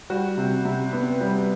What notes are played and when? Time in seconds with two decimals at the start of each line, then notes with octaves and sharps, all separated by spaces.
0.10 G3 F#4
0.38 C3
0.65 C3
0.93 B3
1.21 G3